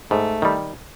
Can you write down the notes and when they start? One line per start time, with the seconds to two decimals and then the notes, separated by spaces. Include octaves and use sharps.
0.11 G#2 A3
0.42 D#3 G3